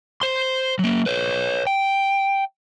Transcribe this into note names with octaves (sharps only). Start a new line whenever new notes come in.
C5 C6
F#3 A#3
B4 C#5
G5